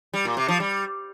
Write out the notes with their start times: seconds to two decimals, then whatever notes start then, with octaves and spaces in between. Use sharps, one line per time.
0.14 G3
0.25 A#2
0.37 C3
0.48 F3
0.60 G3